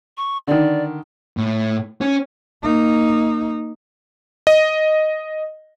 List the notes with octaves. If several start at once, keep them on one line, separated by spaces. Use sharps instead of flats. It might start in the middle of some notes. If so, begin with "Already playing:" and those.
C#6
D3 D#3 D5
A2
C#4
A#3 D#4
D#5